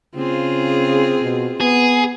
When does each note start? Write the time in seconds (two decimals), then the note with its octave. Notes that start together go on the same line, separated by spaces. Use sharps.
0.15 C#3 C4 F4 G#4
1.22 B2
1.61 B3 G#4